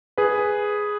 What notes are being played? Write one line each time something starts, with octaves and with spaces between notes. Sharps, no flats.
G#4 B4